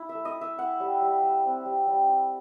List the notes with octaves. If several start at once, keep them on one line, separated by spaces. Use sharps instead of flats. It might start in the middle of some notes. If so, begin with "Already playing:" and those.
Already playing: E4
E5
A3
D#5
E4
E5
E4 F#5
G3
G3
G3
C4
G3
G3
E4